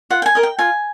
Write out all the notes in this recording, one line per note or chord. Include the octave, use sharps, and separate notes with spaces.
F4 F#5
G5
G#5
A#4 D#5
G5
F4 G#5